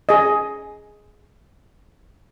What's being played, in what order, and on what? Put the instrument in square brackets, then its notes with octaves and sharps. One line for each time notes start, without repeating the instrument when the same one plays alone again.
[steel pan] G#4 D#5